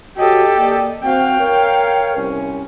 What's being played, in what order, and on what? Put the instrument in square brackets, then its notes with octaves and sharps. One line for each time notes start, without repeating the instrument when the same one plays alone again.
[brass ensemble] F#4 C#5 D#5 [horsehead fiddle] G4 A4
[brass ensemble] A#3 D5 D#5
[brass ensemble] C4 F#4 [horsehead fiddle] F5 G5
[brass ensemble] A#4 C#5
C2 C#4